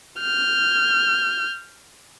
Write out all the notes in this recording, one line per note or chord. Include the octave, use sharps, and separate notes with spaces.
F6 G6